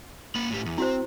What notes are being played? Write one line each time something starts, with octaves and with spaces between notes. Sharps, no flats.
A#3 B5
A2 G4
E2
C4 E4 F#4 C5